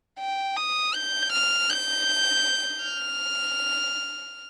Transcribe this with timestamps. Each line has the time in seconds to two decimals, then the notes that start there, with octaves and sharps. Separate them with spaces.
0.19 G5
0.57 D#6
0.94 G6
1.32 F6
1.70 G6
2.84 F6